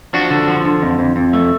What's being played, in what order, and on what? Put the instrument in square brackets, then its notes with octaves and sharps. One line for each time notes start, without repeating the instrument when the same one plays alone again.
[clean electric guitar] F3 D4 F#4
D3
F3
D3
F2
F2
F2
A3